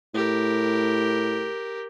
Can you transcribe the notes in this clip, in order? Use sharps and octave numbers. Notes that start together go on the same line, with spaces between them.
A2 G4 A#4